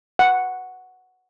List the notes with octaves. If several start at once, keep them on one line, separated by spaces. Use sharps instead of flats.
F#5